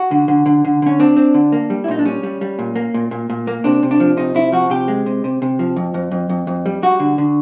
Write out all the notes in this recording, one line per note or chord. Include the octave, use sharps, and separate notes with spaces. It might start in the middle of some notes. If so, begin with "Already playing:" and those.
Already playing: F#4
D3
D3
D3
D3
D3 C#4
C4 D4
C4
D3
A#3
G3
E4
A#2 D#4
D4
G3 C#4
G3
G3
A#2
A#3
A#2
A#2
A#2
A#3
C3 D4
C3
D4
F3
C3 D#4
C3 E4
F3 F#4
C3 G4
G#3
C3
C3
C3
F3
F2
F2
F2
F2
F2
G3
G3 F#4
D3
D3